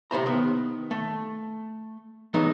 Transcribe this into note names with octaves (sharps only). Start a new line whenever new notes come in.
A2 C3 C5 A#5
D#3 B3
A3
E3 F#3 G#3 B3 D4 D#4